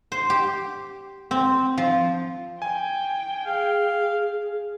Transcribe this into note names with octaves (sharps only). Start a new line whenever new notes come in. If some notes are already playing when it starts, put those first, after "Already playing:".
C5
G4
C4
F3
G5 G#5
G#4 F5